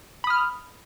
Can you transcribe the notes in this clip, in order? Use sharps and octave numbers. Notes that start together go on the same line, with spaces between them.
B5 D#6 F6